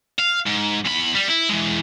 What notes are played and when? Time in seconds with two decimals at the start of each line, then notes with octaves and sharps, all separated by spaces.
0.19 F5
0.47 G#2
0.85 E2 B5
1.15 G3
1.28 E4
1.49 E3 G#3